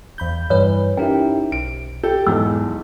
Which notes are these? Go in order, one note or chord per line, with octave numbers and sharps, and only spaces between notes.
E2 B5 G6
G2 E3 B4 C#5
C#4 D#4 E4 G4 A#4 G5
B1 D7
G4 A4 A5 G6
B1 E2 G#2 G#3 E6